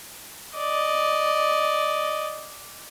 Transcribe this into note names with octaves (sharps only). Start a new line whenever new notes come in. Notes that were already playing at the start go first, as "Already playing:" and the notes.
D5 D#5